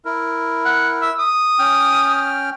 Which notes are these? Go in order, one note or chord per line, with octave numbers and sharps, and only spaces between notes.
E4 A#4
F#5
E5
D#6
C#4 G5 F6